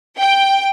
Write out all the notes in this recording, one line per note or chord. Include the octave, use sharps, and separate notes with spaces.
G5